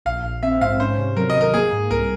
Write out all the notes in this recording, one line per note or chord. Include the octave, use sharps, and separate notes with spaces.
A#1 F5
A#1
C4 E5
G#2 F5
C#4 C5
C3
F#3 A#4
D#5
G#1
A#4
A#3 G#4
G#2
C2 A#4